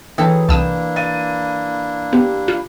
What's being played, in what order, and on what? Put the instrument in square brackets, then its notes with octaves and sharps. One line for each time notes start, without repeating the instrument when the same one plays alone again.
[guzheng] E3 A4 [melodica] F#3 G#4 [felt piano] G5
[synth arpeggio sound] C2 D#6 [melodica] A#3 D4 E4 [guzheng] A5
[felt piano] A6 D#7
[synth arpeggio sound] B3 [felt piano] G4
[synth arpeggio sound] F4